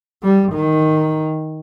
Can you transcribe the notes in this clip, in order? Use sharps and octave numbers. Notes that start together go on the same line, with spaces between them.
G3
D#3